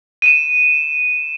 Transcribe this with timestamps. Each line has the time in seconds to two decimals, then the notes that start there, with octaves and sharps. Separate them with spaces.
0.22 D#7 E7